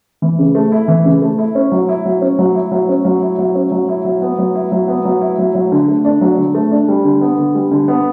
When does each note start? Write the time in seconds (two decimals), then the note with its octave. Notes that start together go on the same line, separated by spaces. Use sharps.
0.22 E3
0.39 C#3
0.55 A3
0.72 E4
0.88 E3
1.05 C#3
1.22 A3
1.38 E4
1.55 C#4
1.72 F#3
1.89 E4
2.05 F#3
2.22 C#4
2.39 F#3
2.55 E4
2.72 F#3
2.89 C#4
3.05 F#3
3.22 E4
3.38 F#3
3.55 C#4
3.72 F#3
3.89 E4
4.05 F#3
4.22 B3
4.39 F#3
4.55 E4
4.72 F#3
4.88 B3
5.05 F#3
5.21 E4
5.38 F#3
5.55 F#3
5.72 D3
5.88 A3
6.05 D4
6.21 F#3
6.38 D3
6.54 A3
6.71 D4
6.88 G3
7.04 D3
7.21 B3
7.38 D3
7.55 G3
7.71 D3
7.88 B3